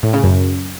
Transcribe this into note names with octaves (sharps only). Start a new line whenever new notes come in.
A2
C#3
F#2